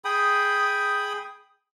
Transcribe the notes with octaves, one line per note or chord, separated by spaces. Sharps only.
G#4 G5 B5 D#6